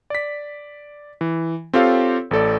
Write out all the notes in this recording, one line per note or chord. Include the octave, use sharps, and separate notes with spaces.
D5 B6
E3
C4 F4 G4 A4 C#5 F5
A1 A3 A4 D5